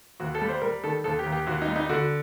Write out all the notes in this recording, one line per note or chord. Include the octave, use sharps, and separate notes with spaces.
D#2 F#4
A4
G3
C5
G3 A#4
D#3 A4
D#2 A4
G4
D#2
G4
D#2 F#4
D#4
G3
D#4
D3 F#4